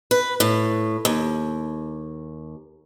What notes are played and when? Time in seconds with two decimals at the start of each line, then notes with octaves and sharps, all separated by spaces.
0.11 B4
0.40 A2
1.05 D#2